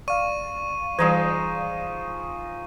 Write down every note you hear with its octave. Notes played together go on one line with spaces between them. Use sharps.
D5 F5 C#6 D#7
E3 F3 G3 G#3 D#4